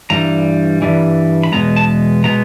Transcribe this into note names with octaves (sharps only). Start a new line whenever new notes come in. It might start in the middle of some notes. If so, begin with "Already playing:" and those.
G2 E3 G3 A#5
G2 E3 G3
B5
E2 B2 G#3 B3 A#5
A5
B2 G#3 B3 A#5